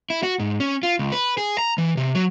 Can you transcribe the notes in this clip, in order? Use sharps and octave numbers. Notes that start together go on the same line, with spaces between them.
E4
F#4
G#2
C#4
F4
C#2
B4
G#4
A#5
E3
C3
F#3